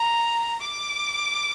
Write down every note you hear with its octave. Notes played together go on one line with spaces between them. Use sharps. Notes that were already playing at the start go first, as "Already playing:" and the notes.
Already playing: A#5
D6